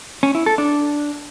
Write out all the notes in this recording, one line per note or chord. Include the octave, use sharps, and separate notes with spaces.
C#4
E4
A4
D4